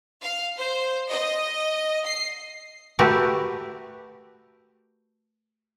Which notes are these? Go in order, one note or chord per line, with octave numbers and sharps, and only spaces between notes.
F5
C5
D#5
C7
A3 F#4 G4 A#4 B4